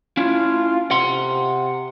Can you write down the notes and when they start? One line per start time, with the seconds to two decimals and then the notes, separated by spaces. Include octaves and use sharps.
0.17 C#4 E4 F4
0.91 C3 F#5 C6